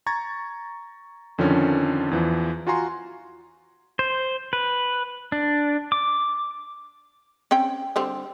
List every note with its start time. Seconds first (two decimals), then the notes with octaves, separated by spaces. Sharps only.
0.07 A#5 C#6 G#6 A6
1.38 F2 D3 D#3 F3 C#4
2.11 E2 E3 F3
2.67 F4 F#4 G#5 A#5 C6
3.99 C5
4.53 B4
5.32 D4
5.92 D6
7.51 C4 C#4 G5
7.96 D3 G3 C4